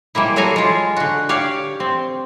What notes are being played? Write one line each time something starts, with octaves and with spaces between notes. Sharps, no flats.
G3 G#3 A#3 E4
F#3 A4 F5 G#5 A#5
G#3 F4
D3 F#4
G4 C#5 D5 F5
C4